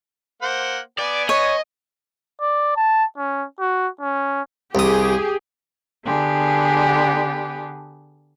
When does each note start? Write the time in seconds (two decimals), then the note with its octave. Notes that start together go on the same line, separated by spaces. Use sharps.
0.42 A#3 C5 F#5
0.98 B3 D5 G#5
1.29 C#5 D#5
2.41 D5
2.76 A5
3.17 C#4
3.60 F#4
4.01 C#4
4.75 C2 G4 G#4 D#6
6.05 D3 B3 G4 G#4